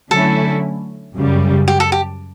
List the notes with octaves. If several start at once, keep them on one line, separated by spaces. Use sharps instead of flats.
D3 F#3 A3 C#4 E4 A4
F#2 C#3 G3
G4
A4
G4